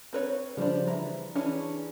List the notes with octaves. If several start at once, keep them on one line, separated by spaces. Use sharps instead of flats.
C4 B4 C#5
C#3 F3 G3 D4 C5
E3 E5 A#5
E3 C#4 D4 G#4